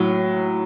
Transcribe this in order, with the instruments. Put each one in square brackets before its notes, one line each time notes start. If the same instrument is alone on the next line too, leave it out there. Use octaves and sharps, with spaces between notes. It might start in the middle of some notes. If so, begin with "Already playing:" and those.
Already playing: [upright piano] A2 F#3